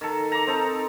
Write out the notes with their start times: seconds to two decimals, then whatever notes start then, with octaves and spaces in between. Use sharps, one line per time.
0.01 D#3 A4
0.32 A#5 D6
0.47 C4 D#4 A4